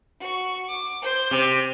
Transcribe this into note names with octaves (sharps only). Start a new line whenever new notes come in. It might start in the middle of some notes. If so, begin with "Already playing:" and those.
F#4 C#6
D6
C5 G6
C3